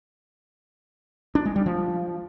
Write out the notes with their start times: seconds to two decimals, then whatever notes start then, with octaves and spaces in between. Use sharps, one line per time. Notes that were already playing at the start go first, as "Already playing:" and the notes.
1.35 D4
1.45 G#3
1.56 G3
1.66 F3